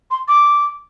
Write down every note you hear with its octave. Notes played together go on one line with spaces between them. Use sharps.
C6
D6